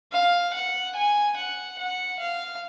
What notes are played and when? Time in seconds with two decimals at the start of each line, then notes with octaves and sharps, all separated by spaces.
0.13 F5
0.54 F#5
0.96 G#5
1.37 F#5
1.79 F#5
2.20 F5